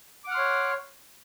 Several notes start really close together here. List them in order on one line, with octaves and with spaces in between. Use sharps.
D6 F#5 F6 C6 C#5